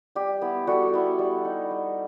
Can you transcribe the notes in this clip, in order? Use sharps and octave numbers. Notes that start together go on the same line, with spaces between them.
G3 G4
B3 E4
G3 F#4 A4
B3 E4
G3
D#4
G3